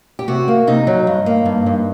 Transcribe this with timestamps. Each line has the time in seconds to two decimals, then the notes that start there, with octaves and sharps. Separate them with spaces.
0.19 G4
0.28 C3 F#4
0.48 A#3
0.67 C3 D#4
0.87 F#3
1.07 G2
1.26 A#3
1.45 G2
1.66 G2